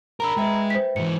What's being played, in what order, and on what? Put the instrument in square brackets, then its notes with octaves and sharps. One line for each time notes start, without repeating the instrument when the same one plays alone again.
[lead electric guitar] D4 A#4 [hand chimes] A#5 B5 E6
[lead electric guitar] G#3 [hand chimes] B4 E5 G5
[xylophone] C5 B6
[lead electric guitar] G#2 E3 [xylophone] C#7